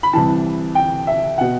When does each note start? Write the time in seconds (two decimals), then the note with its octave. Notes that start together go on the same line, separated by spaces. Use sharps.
0.03 B5
0.13 C2 C3 E3 A5
0.75 G5
1.07 E5
1.38 B2 F#5